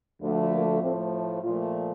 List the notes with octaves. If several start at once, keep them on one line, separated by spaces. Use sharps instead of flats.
D2 D3 F3 A3
A#3
A2 F3 A3 C4
A#2 F3 A3 F4